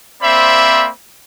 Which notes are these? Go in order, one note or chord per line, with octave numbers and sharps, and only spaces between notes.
A#3 C4 C5 D5 E5 B5